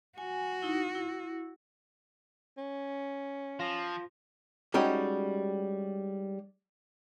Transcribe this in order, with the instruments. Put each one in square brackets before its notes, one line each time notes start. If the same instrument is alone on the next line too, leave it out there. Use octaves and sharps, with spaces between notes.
[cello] F#4 [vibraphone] G#5
[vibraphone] D#4 E4
E4
[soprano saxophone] C#4
[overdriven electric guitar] F3 [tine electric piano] F4 A#6
[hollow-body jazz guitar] G3 G#3 C#4 D#4 F#4 G4